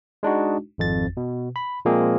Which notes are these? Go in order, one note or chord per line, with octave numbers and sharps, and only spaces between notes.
G#3 D4 D#4 F#4
G#1 F2 A6
B2
B5
A#2 F3 G#3 A#3 C4 G#4